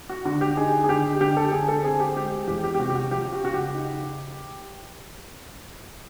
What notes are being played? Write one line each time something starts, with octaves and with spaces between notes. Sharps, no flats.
F#4
D3 F#4
G4
D#4 G#4
G#4
D3 G4
D3 G4
A4
D3 G#4
A4
C4 G#4
G4
G#3 G4
E2 G4
G4
G4
C3 F#4
G4
F#4
F3 G4
F#4
C#3 F#4
G4
D#4